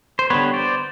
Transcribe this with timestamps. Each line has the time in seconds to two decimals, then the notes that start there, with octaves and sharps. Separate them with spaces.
0.19 C5
0.30 D3 G3 B3 B4 C#5
0.53 C5 D5